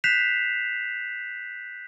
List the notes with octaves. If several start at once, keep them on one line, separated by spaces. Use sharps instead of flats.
F#6 G6 B6 C7 E7 F7